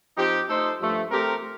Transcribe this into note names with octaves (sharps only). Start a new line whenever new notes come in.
F3 C4 D#4 G4
A3 D#4 A4 C5
G2 F3 A3
A3 C4 G4 A#4